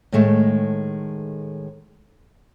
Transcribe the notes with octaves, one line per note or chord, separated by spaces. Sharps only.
A2 D#3 G#3 A3